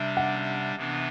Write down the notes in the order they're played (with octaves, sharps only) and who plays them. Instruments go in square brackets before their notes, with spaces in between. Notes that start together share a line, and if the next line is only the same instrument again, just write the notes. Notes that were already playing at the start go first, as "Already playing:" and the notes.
Already playing: [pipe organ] C3 G3 D4 [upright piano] E5
[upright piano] F#5
[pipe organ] C3 E3 B3 D4